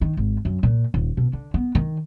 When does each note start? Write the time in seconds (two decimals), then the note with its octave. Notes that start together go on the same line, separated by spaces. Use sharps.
0.01 D#3
0.17 G#1
0.45 F#2
0.63 A#2
0.94 D#1
1.17 B2
1.33 D3
1.54 B3
1.75 D#3